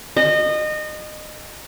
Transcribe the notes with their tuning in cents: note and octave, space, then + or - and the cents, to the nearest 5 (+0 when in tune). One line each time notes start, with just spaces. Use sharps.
D#5 -25